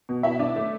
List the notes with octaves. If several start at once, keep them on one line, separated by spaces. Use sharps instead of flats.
B2
B2 E4 E5
D4
A3